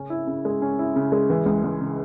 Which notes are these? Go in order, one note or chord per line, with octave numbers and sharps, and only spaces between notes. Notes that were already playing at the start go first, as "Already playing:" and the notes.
Already playing: C#3 C#4
E4
C#3
G#3
C#4
E4
C#3
G#3
E3
C#2
C#2
C#3